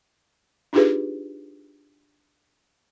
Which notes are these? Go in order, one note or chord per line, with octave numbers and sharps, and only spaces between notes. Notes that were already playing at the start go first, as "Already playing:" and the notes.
D4 D#4 F4 G4 G#4 B4